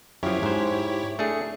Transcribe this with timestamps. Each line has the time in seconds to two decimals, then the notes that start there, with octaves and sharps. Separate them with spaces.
0.23 F#2 F3 E4 G4 C#5
0.43 G#2 C5
1.19 A3 D4 G#4 C#7